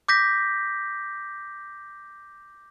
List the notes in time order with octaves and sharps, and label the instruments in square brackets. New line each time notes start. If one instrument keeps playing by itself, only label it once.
[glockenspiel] D6 G6 A#6 B6